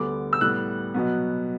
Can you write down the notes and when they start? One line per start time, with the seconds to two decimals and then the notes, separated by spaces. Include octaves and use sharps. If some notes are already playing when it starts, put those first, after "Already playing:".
Already playing: D2 D3 G3 B3 D6
0.33 E6
0.41 A2 G3 B3 F#6
0.94 B2 F#3 B3